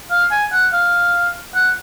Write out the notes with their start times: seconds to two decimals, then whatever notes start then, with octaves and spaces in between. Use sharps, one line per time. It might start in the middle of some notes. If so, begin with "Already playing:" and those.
0.11 F5
0.31 G#5
0.53 F#5
0.73 F5
1.55 F#5